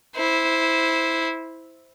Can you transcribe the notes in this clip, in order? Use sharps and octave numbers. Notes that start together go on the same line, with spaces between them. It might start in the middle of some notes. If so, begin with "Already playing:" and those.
E4 C5